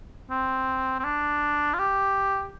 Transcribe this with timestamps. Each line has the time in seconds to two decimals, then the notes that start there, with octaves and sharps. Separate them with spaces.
0.30 C4
0.99 C4
1.04 D4
1.74 F4
1.79 G4